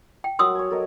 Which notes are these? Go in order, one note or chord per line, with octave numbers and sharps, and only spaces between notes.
G5
F#3 A#4 F#5 C6 D#6 E6
C#5 G#5
A4 A#4 D#5